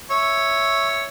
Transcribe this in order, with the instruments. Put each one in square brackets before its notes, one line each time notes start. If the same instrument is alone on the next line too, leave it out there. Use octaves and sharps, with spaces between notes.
[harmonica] C#5 E5